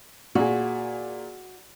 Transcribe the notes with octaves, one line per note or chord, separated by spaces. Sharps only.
A#2 F#4 G#4